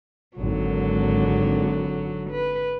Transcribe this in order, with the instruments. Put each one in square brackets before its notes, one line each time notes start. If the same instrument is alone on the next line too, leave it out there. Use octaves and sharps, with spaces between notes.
[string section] G#1 [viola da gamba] D3 F#3
[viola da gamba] B4